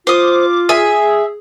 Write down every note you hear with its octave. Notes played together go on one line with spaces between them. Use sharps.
F4 C5 D6 D#6
G#4 E5 G#5